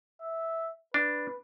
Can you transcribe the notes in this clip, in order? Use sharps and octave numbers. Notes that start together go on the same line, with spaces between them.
E5
D4 B4